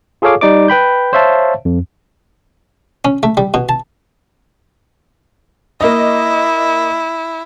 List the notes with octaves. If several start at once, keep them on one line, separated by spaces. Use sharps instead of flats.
F4 G#4 A4 C#5 F5 D6
G3 D#4 D5 D6
B4 G5 B5 G6
C5 C#5 E5 F5 A5
F2
C#4
A3
G3
B2
A5
A#3 E4 D#5